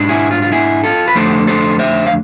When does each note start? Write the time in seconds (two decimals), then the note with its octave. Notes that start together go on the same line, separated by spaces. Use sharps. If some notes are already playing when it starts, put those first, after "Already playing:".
Already playing: G#2 G#3 D4
0.09 E4 G#4
0.31 F4
0.42 F4
0.52 E4 G#4
0.84 F4 A4
1.08 B4
1.15 F2 D3 A3 D4 A4 C5
1.47 A4 C5
1.79 C5 E5
2.07 F5